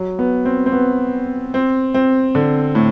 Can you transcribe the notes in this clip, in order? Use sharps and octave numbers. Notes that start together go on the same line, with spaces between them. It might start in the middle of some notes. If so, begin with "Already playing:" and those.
Already playing: F#3
B3
C4
C4
B3
C4
C4
D3
A2